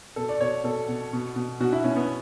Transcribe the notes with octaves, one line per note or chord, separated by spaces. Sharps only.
B2 A4
D5
B2 C#5
B2 A4
B2
B2
B2
B2 F#4
E4
B2 C#4
B3